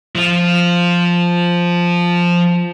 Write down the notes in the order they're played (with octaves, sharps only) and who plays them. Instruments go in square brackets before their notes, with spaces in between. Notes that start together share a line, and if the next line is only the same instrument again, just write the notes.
[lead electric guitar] F3 F4